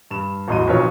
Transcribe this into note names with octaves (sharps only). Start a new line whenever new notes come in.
G2 E7
A1 E2 F#3 D#5 C6 D#7
B1 F2 F4 B4 C#5